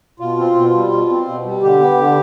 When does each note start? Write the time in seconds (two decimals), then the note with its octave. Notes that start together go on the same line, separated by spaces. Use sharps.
0.20 B2 F4
0.38 C4
0.56 B2
0.74 G3
0.91 B2
1.09 C4
1.27 B2
1.45 G3
1.63 D3 G4
1.80 B3
1.99 D3